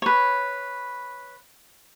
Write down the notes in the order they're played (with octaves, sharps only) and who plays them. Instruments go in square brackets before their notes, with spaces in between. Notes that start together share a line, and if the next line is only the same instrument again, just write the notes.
[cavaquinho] B4 C#5